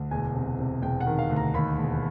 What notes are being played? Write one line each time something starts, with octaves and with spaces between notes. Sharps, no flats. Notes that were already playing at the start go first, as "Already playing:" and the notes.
Already playing: D2
E1 G#5
C3
C3
E1 G5
F#5
D#3
F5
D2
A#5
D#2 B5
E1